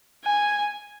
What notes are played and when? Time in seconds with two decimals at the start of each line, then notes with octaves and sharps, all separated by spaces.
0.25 G#5